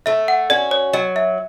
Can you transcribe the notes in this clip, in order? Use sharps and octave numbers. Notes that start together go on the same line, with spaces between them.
A3 E5
F#5
C#4 F#4 D5
C#5
F#3 D#5
E5